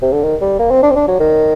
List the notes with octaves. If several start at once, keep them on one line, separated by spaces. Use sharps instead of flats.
C3
D3
D#3
G3
A#3
C4
D4
C4
D4
F#3
D#3